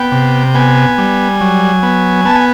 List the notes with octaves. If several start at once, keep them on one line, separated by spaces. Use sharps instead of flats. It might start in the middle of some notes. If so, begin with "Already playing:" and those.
Already playing: B3 G5
C3
B3 G#5
G3
F#3
B3
B3 A5
G#5